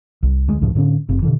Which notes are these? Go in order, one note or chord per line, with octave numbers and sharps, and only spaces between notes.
C2
D2 G#3
C#2 A2 C#3 F3
A2 D3 C#4
F#1 C3
B2 D3 E3